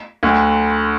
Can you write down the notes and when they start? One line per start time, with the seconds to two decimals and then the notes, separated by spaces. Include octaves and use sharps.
0.23 D2 D3